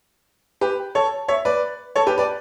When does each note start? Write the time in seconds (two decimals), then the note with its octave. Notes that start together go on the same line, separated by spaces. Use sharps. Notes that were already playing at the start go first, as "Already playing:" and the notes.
0.61 G4 B4
0.95 A4 C#5
1.28 C#5 E5
1.45 B4 D5
1.96 A4 C#5
2.07 G4 B4
2.18 B4 D5